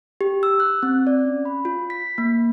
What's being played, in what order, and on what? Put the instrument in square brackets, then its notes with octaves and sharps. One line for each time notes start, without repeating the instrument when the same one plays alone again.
[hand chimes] G4
E6
F#6
C4
D5
C#4
B5
F4
B6
A#3